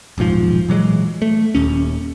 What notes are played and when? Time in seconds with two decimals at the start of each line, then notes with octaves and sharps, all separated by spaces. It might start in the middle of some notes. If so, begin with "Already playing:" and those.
0.18 D#1 B1 G#2 F3
0.69 A#2 E3 F#3 G#3
1.22 A3
1.55 D#1 D#2 C#4